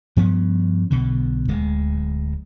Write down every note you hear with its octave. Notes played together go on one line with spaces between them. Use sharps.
G2 F3 B3 C#4
B1 B2 D3
D1 G#3